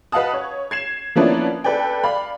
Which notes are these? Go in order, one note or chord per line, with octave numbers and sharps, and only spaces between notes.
B4 D#5 F5 F#5 A5 D#6
C#5
G#6 C7 E7
F3 A#3 B3 C#4 D4 E4
A4 B4 D5 G5
D5 F5 B5